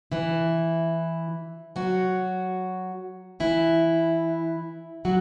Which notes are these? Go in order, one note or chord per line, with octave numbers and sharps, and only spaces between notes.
E3 E4
F#3 F#4
E3 E4
F#3 F#4